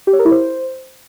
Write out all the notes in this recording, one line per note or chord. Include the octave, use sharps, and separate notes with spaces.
G4
C#5
A#4
E4
C5